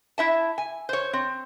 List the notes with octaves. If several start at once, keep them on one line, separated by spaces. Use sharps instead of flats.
E4 E5 A5
G#5
C5 C#5
C4